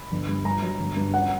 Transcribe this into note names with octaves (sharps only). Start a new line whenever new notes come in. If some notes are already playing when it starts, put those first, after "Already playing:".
Already playing: B5
G1
G2
G2 A#5
F#3
G1
G2
C#4 F#5